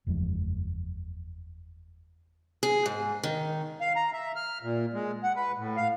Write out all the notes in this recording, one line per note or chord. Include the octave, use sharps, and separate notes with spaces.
F#1 E2 F3 G#3
G#4
G#2
D#3
F5
A#5
E5
F6
A#2
G#3
F#5
B4
A2
F5